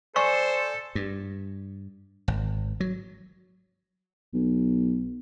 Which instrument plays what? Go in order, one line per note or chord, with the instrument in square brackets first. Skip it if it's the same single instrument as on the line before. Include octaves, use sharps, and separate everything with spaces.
[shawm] A4 [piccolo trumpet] C5 [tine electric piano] D5 G#5 [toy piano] C#6
[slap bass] G2
G#1
F#3
[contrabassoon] B1